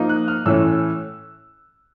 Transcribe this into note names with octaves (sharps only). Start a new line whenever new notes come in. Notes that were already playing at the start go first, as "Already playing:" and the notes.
Already playing: F3 A#3 D#4
F#6
F6
A2 E3 A3 C#4 E6